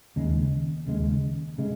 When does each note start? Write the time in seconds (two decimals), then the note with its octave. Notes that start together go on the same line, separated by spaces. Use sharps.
0.16 D#2 C#3 G#3
0.87 D#2 C#3 G#3
1.58 C#3 G#3